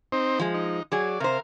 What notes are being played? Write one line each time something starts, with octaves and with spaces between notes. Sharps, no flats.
C4 D#4 C5
F3 G#3
D#4
F#3 G#4 D5
C3 A#4 C5 F5